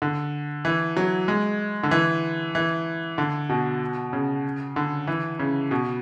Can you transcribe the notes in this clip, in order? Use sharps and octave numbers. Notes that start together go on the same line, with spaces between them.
D3
E3
F#3
G#3
D3
E3
E3
D3
B2
C#3
D3
E3
C#3
B2